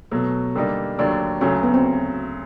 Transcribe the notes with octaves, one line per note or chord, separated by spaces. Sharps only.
B2 F#3 A3
D3 G3 A#3 D#4
D#2 D3 F#3 A3 D4
D2 C#3 F#3 A3 C#4
B3
C4